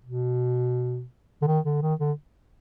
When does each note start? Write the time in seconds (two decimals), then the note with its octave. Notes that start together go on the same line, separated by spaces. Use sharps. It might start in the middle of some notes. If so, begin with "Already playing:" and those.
0.05 B2
1.42 D3
1.47 D#3
1.65 D3
1.82 D#3
2.00 D3